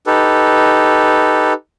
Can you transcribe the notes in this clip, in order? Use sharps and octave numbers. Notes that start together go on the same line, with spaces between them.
D#4 G4 A4 B4